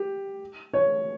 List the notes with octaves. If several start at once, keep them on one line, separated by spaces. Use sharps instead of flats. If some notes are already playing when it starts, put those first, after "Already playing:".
Already playing: G4
C#5